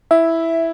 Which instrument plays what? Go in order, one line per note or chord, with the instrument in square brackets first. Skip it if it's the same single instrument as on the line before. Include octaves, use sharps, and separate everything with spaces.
[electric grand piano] E4 [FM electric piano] E5